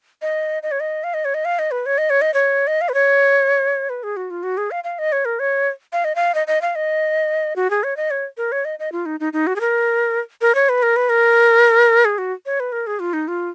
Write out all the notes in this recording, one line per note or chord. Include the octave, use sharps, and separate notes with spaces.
D#5
D#5
C#5
D#5
F5
D#5
C#5
D#5
F5
D#5
B4
C#5
D#5
C#5
D#5
C#5
D#5
F5
B4
C#5
B4
G#4
F#4
F4
F#4
G#4
F5
F5
D#5
C#5
A#4
C#5
F5
D#5
F5
D#5
D#5
F5
D#5
F#4
G#4
C#5
D#5
C#5
A#4
C#5
D#5
D#5
F4
D#4
D#4
D#4
F#4
G#4
A#4
A#4
C#5
B4
A#4
B4
A#4
G#4
F#4
C#5
B4
A#4
G#4
F4
D#4
F4